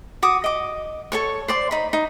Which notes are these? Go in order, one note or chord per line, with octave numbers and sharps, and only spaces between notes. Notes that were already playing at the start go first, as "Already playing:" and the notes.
F#4 D6 D#6
D#5 D6
A4 C#5 C#6
C5 D5 C6
D#4 B5
D#4